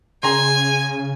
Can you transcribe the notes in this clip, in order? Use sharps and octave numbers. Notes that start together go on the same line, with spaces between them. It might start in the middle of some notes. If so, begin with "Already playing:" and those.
C#3 G#4 G#5 A#5 C6